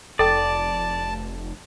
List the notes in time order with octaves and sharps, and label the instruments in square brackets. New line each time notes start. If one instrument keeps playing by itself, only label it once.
[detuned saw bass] F1 [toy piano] A4 G5 [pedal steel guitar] D5 [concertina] A5